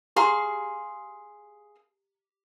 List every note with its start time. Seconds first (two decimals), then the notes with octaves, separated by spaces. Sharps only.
0.16 G4 G#4 F5 A#5 C6